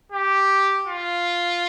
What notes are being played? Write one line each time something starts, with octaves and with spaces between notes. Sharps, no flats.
G4
F4